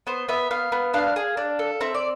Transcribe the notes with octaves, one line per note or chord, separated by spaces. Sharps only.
B3 C5
B3 E5
B3 F5
B3
D4 F5
G#4
D4
A4
C4 E5
D5